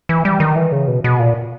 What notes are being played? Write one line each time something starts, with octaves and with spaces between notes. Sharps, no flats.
E3
G3
D#3
E3
C#3
B2
B2
A#2